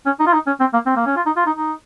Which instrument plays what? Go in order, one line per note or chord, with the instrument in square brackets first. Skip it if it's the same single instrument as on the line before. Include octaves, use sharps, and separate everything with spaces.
[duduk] C#4
D#4
F4
D#4
C#4
C4
A#3
C4
A#3
C#4
F4
D#4
F4
D#4
D#4